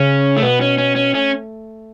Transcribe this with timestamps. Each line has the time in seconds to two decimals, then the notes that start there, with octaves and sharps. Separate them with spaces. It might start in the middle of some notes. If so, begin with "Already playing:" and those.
Already playing: C#3 C#4
0.37 A3
0.42 B2 B3
0.61 C#4
0.78 C#4
0.96 C#4
1.14 A3 C#4